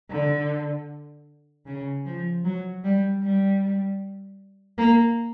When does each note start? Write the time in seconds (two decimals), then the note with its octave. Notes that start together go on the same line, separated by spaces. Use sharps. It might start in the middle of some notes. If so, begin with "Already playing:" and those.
0.10 D3
1.66 C#3
2.05 F3
2.44 F#3
2.84 G3
3.23 G3
4.78 A#3